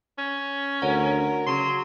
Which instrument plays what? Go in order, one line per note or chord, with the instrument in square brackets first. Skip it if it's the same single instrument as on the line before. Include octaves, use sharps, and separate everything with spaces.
[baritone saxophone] C#4
[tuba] D2 [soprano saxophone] A#4 [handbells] C#5 F#5
[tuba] C#3 [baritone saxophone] F#3 [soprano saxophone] C6